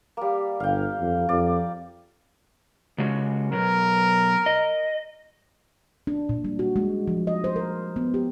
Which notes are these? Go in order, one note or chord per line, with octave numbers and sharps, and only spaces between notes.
G3 A#3
G1 F5 G5
F2
F2 D5
C#3 G#3 F#4
B2 F#3 A#4
D#5
D4
A#2
G3
F#4
G#3
F3
D#5
C5
A#4
B3
G4